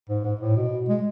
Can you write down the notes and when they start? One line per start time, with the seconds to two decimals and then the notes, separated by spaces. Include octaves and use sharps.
0.09 G#2
0.24 G#2
0.41 A2
0.56 B2
0.89 G#3